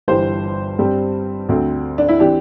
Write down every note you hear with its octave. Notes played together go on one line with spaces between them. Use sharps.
G1 G2 E3 G4 C5
G2 G3 C4
D2 D3 C4
D4
E4
E3 C4 D4 G4